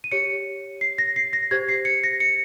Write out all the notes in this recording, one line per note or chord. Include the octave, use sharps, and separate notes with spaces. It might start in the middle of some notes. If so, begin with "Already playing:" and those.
D#7
G4 C#5 C#7
C7
A#6
C7
A#6
G4 C5 G#6
C7
C#7
A#6
C#7